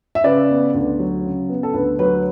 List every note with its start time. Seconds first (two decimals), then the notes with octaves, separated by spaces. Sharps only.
0.15 E5
0.24 C#3 B4 D5
0.49 B3
0.74 D2
0.99 F#3
1.24 C#3
1.49 B3
1.63 A4
1.74 D2 B4
1.99 F#3 B4